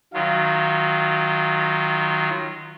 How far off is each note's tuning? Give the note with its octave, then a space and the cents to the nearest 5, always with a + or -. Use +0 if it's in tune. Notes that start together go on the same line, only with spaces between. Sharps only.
D#3 +0 F#3 -5 F4 -25